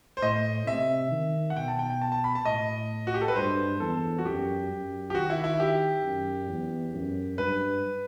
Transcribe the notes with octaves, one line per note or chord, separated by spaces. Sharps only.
C5
A2 D#5
C3 E5
D#3
F#5
B2 G5
A5
G5
G5
A5
A5
B5
A5
A2 D#5
F#4
G4
A4
B4
G2 C5
E2 A4
F#4
F#2 G4
F#2
G4
D#3 F#4
E4
E4
G4
F#2
E2
F#2
G2 B4